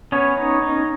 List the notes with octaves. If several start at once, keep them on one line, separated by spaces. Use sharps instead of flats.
B3 C#4 C#5
D#4
D#4